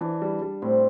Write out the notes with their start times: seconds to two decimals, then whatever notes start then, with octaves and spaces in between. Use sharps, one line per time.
0.01 E3 D4
0.22 G3
0.42 G3
0.62 A2 C4